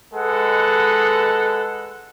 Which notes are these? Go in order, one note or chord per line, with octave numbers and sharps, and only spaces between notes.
G#3 A4 B4 F#5